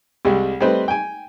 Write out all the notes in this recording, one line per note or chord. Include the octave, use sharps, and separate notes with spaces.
C2 G3 G#3
G3 A3 C4 B4 C5 D#5
G5 G#5